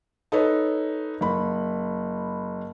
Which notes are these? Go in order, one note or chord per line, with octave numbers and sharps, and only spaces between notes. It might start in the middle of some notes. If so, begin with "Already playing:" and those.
D#4 A4 B4 C#5
F#1 B5